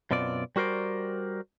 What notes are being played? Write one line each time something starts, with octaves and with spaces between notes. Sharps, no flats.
F#2 B2 C4 F4 D5
G3 F#4 A#4 C5 D5